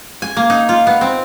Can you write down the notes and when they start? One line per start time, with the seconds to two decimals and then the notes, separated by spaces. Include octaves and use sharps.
0.22 G#5
0.37 A#3
0.50 D#4
0.69 F4
0.87 B3
1.01 C4